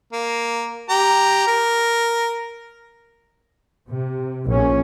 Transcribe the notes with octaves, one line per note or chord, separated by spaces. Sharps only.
A#3
G4 A#5
A#4
C3
A#1 A#2 C#4